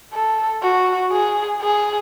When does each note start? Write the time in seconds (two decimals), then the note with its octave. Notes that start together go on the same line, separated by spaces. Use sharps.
0.13 A4
0.62 F#4
1.11 G#4
1.61 G#4